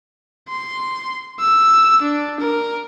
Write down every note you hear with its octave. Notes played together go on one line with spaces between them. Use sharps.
C6
E6
D4
A#4